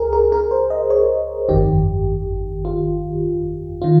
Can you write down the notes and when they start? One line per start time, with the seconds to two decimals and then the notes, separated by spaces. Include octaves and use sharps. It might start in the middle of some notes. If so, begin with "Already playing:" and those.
Already playing: C#2 G#4 A#4
0.13 A#4
0.32 A#4
0.51 C5
0.70 D#5
0.90 C#5
1.49 G1 F2 D#3 G4
2.65 F4
3.82 D#3 F4